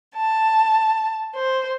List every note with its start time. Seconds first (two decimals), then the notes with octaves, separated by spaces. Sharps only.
0.17 A5
1.35 C5